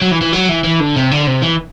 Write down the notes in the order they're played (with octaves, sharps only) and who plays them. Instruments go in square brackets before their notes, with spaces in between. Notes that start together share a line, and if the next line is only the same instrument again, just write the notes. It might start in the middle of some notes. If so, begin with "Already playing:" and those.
[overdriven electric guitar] F#3
E3
E3
F#3
E3
E3
D3
C3
D3
C3
E3